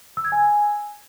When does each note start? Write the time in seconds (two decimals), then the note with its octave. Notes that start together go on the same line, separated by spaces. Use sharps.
0.17 E6
0.25 G#6
0.32 G#5